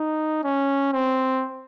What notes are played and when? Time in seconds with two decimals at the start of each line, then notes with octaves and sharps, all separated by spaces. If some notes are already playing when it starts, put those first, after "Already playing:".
Already playing: D#4
0.44 C#4
0.93 C4